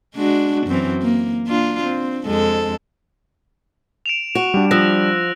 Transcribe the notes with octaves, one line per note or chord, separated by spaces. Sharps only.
G#3 D4 F#4
F#2 E3 C4
A#3
A#3 D4 F4
C4
F2 G#3 A4
D7 E7 F7
F#4
G3 D4
F3 E6 F#6 A#6